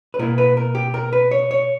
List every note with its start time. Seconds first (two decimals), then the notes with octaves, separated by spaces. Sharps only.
0.14 B4
0.19 B2 A#3 E4 A#4
0.38 B4
0.57 A#4
0.75 G4
0.94 A#4
1.13 B4
1.31 C#5
1.51 C#5